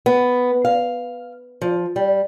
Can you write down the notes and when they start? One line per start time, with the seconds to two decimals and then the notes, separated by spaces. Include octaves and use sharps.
0.06 B3
0.65 F5
1.61 F3
1.96 G3